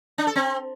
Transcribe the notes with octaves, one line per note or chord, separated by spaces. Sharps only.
D4
A4
C4